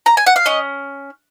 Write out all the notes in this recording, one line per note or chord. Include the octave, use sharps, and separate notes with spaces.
A#5
G#5
F#5
F5
C#4 D#5